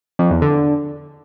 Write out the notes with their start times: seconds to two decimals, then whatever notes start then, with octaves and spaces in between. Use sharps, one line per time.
0.19 F2
0.30 E2
0.42 D3